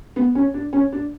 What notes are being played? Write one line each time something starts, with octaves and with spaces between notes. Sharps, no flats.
B3
C#4
D4
C#4
D4